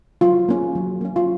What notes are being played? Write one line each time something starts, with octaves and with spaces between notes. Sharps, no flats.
F#3 F4
A#3 C#4
F#3
A#3 C#4
F4